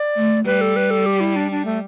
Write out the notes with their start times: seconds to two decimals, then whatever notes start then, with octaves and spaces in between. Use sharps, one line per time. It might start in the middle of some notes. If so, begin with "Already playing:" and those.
Already playing: D5
0.16 A3
0.46 G3 B4
0.61 A4
0.76 B4
0.91 A4
1.06 G4
1.20 E4
1.36 D4
1.51 D4
1.65 A3